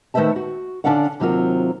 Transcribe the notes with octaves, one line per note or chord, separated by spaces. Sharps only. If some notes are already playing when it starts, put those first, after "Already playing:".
D#3 A3 B4 C5 E5 A5
F#4
D3 C#4 D4 D5 F5 F#5
D#2 C3 F#3 C4 F4 A#4